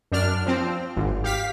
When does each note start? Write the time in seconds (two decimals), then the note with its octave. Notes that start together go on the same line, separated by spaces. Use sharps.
0.12 F#2 D4 F6
0.46 F3 C4
0.96 G#1
1.24 G4 F5 B6